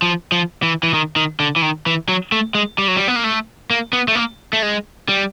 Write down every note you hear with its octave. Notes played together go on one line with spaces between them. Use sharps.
F3
F3
E3
E3
D#3
D#3
D3
E3
D#3
E3
F#3
A3
G#3
G3
F#3
G3
B3
A#3
A3
A#3
B3
A3
A#3
A3
G#3
G3